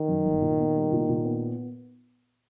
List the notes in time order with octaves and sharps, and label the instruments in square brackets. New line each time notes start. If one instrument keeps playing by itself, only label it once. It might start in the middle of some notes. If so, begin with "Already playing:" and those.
Already playing: [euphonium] D#3
[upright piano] F#2
G1
A#2
B3
G3
A#2
A#2
B3